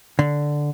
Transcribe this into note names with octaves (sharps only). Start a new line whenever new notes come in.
D3